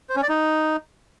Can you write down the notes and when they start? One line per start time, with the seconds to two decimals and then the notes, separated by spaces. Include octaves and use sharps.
0.09 C5
0.16 C#4
0.23 D5
0.29 D#4